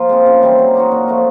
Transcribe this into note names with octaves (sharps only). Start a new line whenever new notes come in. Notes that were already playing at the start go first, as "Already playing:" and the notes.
Already playing: F3 A#3
G#3 C4 F4
C#3
E3 G3 C4
F#3
A#3 D#4 F#4
A#2
F3 A3